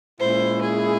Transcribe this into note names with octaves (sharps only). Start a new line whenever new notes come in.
A#2 G#3 C#4 E4 C5
G#4